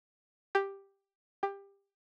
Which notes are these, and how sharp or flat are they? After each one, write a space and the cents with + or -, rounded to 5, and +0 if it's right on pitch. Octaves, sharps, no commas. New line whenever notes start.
G4 +5
G4 +20